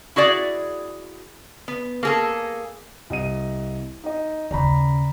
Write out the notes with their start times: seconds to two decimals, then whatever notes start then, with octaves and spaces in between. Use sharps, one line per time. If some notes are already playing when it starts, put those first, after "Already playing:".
0.16 E4 F#4 G#4 D5
1.68 B3
2.03 A#3 G#4 A4
3.10 C2 D#5 D#7
4.04 D#4 D#5
4.51 D#2 C#3 D5 A#5 B5